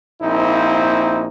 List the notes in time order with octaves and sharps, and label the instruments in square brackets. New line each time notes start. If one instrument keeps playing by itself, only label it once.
[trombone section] A#1 A#3 C4 D#4 E4